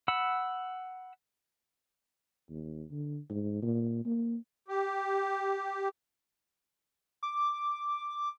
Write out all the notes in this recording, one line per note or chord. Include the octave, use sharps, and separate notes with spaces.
F#5 B5 E6
D#2
D3
G#2
A#2
A#3
G4
D6